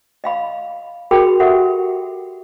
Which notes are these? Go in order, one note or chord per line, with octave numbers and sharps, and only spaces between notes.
D#5 F5 B5
F#4 G#4 A#4 G5 B5
F#4 G4 A4 E5 F#5